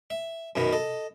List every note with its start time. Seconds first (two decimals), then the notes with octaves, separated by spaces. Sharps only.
0.10 E5
0.56 F#2 B2 D#3 B3
0.72 A4 D#5